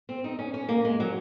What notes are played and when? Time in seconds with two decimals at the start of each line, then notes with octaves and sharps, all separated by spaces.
0.09 C4
0.24 D#4
0.39 C#4
0.54 C#4
0.69 A#3
0.85 G#3
1.00 F#3